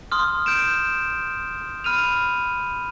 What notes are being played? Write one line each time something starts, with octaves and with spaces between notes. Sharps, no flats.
C6 D#6 F6
G6 D7 E7
B5 F6 D#7 F7